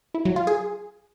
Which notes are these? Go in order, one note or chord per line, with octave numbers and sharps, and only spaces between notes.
E4
F#3
F4
G#4